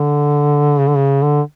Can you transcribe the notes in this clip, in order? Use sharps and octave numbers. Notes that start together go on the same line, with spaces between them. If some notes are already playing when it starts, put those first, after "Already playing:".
Already playing: D3
C#3
D3
C#3
D3